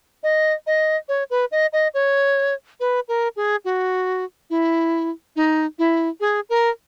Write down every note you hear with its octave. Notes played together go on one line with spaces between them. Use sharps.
D#5
D#5
C#5
B4
D#5
D#5
C#5
B4
A#4
G#4
F#4
E4
D#4
E4
G#4
A#4